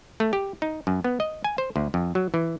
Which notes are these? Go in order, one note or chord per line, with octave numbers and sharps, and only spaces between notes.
A3
G4
D#4
F#2
B3
D#5
G#5
C5
D2
F2
F#3
E3